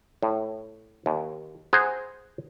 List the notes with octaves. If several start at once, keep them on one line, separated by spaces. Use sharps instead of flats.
A2
D#2
G#4 C5 F#5 G#5 A#5